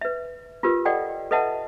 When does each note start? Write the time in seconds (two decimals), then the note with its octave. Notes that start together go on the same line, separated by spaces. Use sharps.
0.01 B4 E5
0.63 F4 G4 A#4 B4
0.85 A4 D5 D#5 F#5 G5
1.31 A4 B4 D#5 E5 F#5 A5